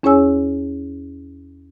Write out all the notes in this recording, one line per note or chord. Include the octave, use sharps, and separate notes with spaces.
E2 C#4 G#4 C#5 G#5 E6